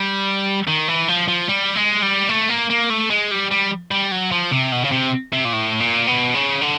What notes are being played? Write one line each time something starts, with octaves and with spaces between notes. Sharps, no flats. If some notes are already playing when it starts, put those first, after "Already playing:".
Already playing: G3
D#3
E3
F3
F3
G3
G#3
G3
A3
A#3
A#3
A3
G#3
G3
G3
G3
F#3
F3
C3
B2
C#3
C3
C3
A#2
A2
A#2
B2
C#3
D3